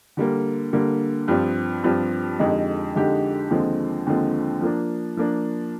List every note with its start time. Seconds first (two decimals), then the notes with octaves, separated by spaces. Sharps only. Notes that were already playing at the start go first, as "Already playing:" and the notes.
0.17 D3 G3 A#3
0.73 D3 G3 A#3
1.28 G2 F3 C4 G4
1.84 G2 F3 C4 G4
2.39 F2 D3 G#3 D#4 G4
2.95 F2 D3 G#3 D#4 G4
3.50 D#2 D3 F3 G#3 C4
4.06 D#2 D3 F3 G#3 C4
4.61 F3 A#3 D4
5.17 F3 A#3 D4